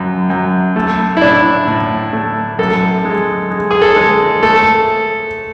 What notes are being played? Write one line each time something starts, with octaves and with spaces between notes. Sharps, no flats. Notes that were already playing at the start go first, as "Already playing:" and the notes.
Already playing: F#2
F#2
A3
E4
A2 D4
A2
A3
F#2 A4
G#3
G#3
G#4
A4
G#3
A3 A4